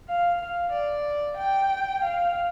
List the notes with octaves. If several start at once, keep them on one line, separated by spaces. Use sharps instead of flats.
F5
F5
D5
G5
F5